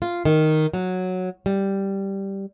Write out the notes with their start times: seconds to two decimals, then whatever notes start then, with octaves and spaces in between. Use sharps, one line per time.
0.02 F4
0.25 D#3
0.73 F#3
1.46 G3